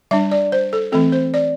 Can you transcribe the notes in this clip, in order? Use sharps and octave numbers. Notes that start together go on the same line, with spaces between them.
G3 D4 E5
D5
C5
A4
E3 A3 C4 A4
C5
D5